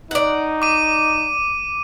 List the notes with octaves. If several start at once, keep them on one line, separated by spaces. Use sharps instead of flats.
D#4 D5 F#5
D6 D#7